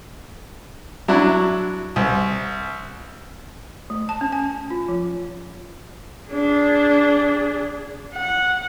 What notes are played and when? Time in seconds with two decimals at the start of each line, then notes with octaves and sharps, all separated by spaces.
1.08 F#3 D4 E4
1.96 C2
3.90 A3
4.09 A5
4.21 C#4
4.32 G#5
4.70 F4
4.88 F3
6.31 D4 G#4
8.14 F#5